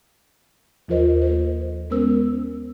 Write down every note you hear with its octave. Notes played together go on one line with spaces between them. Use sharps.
D#2 F3 F4 A#4 C5 D#5
A#3 A4 C5
G#3 B3 C#4 A#4 C5 E6